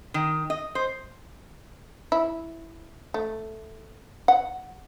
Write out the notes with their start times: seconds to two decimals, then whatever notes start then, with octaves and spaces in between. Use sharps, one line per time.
0.14 D#3
0.50 D#5
0.75 C5
2.12 E4
3.14 A3
4.28 F#5